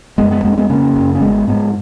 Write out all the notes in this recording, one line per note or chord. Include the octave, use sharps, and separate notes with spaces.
F#1 G#3 B3
G#3 B3
F2 G#3 B3
C#4
G#3 B3
C#3 A#3 C#4
F#1
C#4
G#1 G#3 B3
G#2 G#3 B3